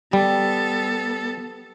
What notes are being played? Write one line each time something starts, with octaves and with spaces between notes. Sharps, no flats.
G3 B3 A4